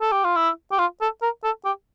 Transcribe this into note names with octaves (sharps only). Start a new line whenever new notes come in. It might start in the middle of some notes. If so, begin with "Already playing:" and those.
A4
G4
F4
E4
G4
F4
A4
A#4
A4
G4